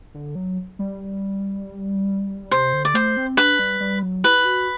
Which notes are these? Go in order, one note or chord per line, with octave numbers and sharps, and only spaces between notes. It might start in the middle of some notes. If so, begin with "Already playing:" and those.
D3
F#3
G3
C3 C5
D3
D5
A3 C5
C4
D4 B4
G3
G3
F#3
E4 B4
F#4